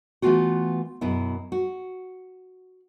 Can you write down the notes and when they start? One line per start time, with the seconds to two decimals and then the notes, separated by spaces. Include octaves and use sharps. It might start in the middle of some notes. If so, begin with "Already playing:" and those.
0.22 E3 A3 B3 C4 F4 F#4
1.01 F#2 B2 B3 E4
1.52 F#4